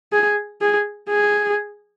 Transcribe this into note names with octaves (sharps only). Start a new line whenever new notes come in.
G#4
G#4
G#4